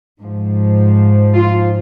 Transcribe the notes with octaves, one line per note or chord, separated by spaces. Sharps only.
G#2 F3
F4